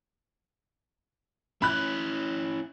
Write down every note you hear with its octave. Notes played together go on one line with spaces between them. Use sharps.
C#4 E4 B5 F#6